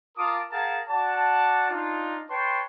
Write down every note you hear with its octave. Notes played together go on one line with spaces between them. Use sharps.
F4 A#4 A5 D6 D#6
G#4 A#4 F5 F#5 A5
F#4 D5 F#5 A5
D4 D#4 F4
B4 C#5 G5 A5 C6 C#6